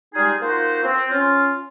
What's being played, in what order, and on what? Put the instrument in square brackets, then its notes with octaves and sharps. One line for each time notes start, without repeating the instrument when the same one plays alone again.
[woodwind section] G3 G#3 D#4 F4 G#4
A#3 D#4 F4 F#4 C5
C4
C#4 F4